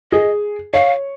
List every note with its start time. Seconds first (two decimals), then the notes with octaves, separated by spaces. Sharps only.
0.12 G#4 D#5
0.74 C#5 F5